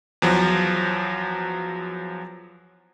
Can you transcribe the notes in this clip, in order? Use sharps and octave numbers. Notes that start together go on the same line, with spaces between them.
E2 F3 F#3